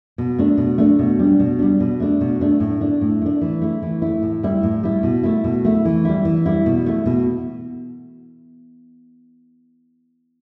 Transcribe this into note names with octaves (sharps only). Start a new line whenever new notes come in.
B2
A3 D4
B2
A3 D4
B2
G3 D4
B2
G3 D4
B2
A3 D4
B2
A3 D4
A2
A3 D4
A2
A3 D4
E3
A3 E4
E3
A3 E4
A2
G3 E4
A2
G3 E4
B2
A3 E4
B2
A3 E4
E3
G3 E4
E3
G3 E4
B2
A3 E4
B2